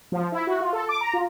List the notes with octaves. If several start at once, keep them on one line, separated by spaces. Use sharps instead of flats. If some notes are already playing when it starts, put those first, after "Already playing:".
F3
E4
F#4
F4
A4
D6
A#5
F4